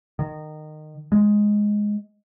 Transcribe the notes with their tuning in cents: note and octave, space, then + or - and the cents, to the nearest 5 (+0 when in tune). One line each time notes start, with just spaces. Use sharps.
D#3 -20
G#3 +0